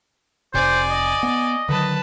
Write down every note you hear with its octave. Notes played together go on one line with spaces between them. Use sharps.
F1 C3 C5 D5 G#5
D#5
B3
D3 D#3 F#3 B4 A5